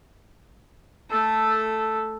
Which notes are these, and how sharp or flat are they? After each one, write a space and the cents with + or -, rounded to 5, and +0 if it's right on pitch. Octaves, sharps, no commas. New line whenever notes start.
A3 +0 A4 +0